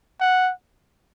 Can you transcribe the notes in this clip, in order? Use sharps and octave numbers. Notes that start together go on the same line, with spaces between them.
F#5